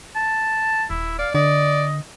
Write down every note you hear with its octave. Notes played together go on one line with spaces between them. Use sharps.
A5
D#1 E4
D5 F5
D3 D5 D#5